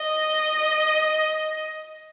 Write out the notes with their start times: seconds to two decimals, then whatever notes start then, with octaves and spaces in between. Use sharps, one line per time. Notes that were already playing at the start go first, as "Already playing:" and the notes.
Already playing: D#5